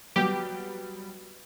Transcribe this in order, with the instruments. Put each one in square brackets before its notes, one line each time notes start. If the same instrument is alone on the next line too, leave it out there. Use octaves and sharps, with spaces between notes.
[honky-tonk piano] F#3 G3 B3 [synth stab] G4